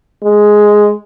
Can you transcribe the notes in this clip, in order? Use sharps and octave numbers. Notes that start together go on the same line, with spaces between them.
G#3